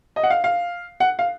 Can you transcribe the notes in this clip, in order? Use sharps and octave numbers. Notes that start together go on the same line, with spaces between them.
D#5
F#5
F5
F5
F#5
F5